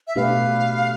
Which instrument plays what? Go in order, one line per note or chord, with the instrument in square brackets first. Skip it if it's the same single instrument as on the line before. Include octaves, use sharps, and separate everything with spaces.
[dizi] E5
[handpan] B2 A3 D4 G4 B4 [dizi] F5